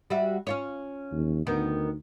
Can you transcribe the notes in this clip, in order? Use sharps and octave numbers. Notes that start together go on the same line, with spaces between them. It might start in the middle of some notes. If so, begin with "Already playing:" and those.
G3 F#4 E5
C#4 F4 C#5
D#2
D2 D#3 B3